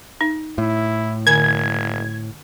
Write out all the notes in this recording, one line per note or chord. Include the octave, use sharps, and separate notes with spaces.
D#4
A2 E4
F#1 D3 G#5 G#6